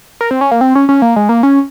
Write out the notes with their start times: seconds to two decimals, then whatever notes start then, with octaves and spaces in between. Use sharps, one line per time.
0.21 A#4
0.31 C4
0.41 C#4
0.51 A#3
0.61 C4
0.75 C#4
0.89 C#4
1.02 A#3
1.16 G#3
1.29 A#3
1.43 C#4